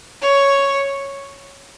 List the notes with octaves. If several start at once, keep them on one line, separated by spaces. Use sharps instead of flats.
C#5